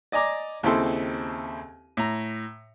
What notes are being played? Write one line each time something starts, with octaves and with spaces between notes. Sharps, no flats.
D5 D#5 G#5 A#5 D6
D#2 C#3 C4 E4 A4 C6
A2 A#5